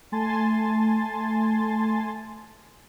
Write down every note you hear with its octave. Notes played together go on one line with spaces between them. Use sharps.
A3 G#5 A5 C6 A6